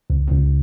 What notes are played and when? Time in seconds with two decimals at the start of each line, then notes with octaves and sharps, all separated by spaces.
0.10 C#2
0.31 C#2